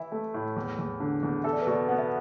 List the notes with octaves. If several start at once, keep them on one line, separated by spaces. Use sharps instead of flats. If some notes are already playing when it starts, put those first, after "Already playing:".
Already playing: E3 E4
A3
A2
E2
E2
D3
E2
A4 E5
D5
B4
B2 D5
B3 F#5
E5